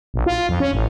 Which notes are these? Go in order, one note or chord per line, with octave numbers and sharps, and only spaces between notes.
A#1
F4
F2
C#4
A1